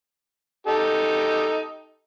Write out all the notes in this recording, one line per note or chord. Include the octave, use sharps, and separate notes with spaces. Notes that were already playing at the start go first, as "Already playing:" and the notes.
D#4 G4 A4